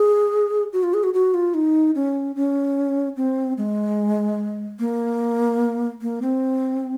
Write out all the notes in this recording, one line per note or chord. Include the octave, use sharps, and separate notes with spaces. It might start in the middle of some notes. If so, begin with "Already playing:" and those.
Already playing: G#4
F#4
F4
G#4
F#4
F#4
F4
D#4
C#4
C#4
C4
G#3
A#3
A#3
C4